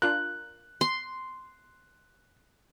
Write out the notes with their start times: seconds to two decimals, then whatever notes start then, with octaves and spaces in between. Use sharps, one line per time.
0.02 D4 F4 A#4 F#6
0.81 C6